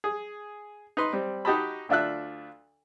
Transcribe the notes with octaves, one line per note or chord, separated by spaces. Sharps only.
G#4
D#4 B4 C6
G3 C4
D#4 F#4 G4 D#5 A5 B5
D2 D4 F4 E5 F#6